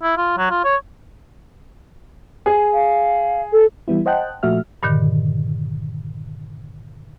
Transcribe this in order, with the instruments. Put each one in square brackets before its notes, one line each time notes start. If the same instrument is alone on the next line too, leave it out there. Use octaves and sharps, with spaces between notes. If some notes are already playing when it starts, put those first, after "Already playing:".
[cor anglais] E4
F4
F#3
F4
C#5
[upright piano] G#4
[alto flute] F5
A4
[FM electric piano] E3 G3 B3 E4
C5 D#5 F#5 G5 A5 F#6
A#2 F3 A3 F#4 E5 F6
[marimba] G2 A#2 D3 D#3